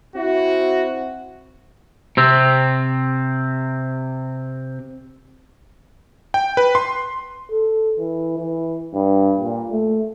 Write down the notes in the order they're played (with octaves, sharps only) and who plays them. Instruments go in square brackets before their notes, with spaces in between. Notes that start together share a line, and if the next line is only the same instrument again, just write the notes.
[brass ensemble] C4 E4 F#4
[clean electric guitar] C3 C4
[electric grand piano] G5
B4
C6
[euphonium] A4
E3
E3
G2
A#2
A3